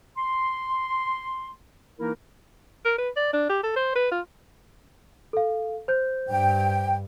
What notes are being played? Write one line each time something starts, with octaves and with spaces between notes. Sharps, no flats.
C6
E3 A#3 D#4 E4 A#4
A#4
B4
D5
D4
G4
A4
C5
B4
F4
A4 F5
C5 G6
G2 G5